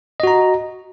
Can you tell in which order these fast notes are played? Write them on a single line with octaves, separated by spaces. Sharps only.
D#5 F#4 A#5